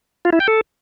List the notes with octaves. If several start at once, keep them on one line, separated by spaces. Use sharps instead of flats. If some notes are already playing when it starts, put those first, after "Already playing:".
F4
E4
G5
A4